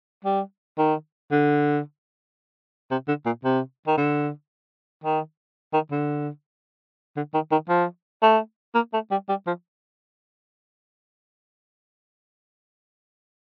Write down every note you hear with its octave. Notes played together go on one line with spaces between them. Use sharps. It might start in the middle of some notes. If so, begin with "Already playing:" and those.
G3
D#3
D3
C3
D3
A#2
C3
D#3
D3
D#3
D#3
D3
D3
D#3
D#3
F3
A3
A#3
A3
G3
G3
F3